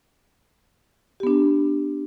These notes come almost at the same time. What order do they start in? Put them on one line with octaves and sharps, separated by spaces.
G4 B3 D4